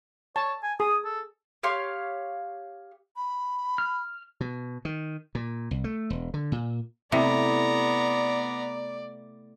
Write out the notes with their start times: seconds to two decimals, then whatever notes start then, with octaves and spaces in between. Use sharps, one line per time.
0.36 C#5 A5
0.63 G#5
0.80 G#4 D#6
1.05 A4
1.63 G4 C#5 F5 C6
3.17 B5
3.78 F6
4.41 B2
4.85 D#3
5.35 A#2
5.71 C2
5.84 A3
6.10 E1
6.34 D3
6.52 A#2
7.12 C3 A3 B3 E4 G4 D5 A#5